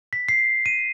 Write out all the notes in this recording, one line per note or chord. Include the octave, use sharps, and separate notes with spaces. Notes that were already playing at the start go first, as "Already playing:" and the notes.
B6
C7
D#7